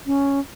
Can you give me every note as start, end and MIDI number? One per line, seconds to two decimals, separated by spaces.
0.06 0.40 61